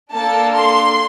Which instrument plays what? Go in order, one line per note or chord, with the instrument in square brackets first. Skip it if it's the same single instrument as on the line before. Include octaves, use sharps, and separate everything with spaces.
[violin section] A#3 D4 A4 A5
C6